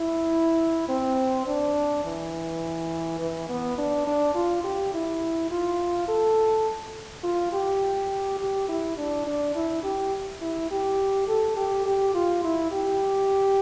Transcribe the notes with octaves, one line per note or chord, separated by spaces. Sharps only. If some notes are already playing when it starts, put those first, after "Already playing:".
Already playing: E4
C4
D4
E3
E3
B3
D4
D4
F4
G4
E4
F4
A4
F4
G4
G4
E4
D4
D4
E4
G4
E4
G4
A4
G4
G4
F4
E4
G4